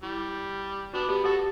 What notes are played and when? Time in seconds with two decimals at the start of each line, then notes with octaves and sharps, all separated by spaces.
0.03 G3 E4
0.94 B3 D4 F#4
1.09 B3 G4
1.24 F#4 G4 A4